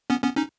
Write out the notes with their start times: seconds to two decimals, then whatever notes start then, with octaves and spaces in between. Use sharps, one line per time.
0.10 B3 C#4
0.23 B3 C#4
0.37 C#4 D#4